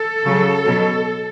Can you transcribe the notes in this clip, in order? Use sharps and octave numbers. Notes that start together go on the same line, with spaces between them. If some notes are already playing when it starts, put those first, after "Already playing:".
Already playing: A4
C#3 F#3
B2 F#3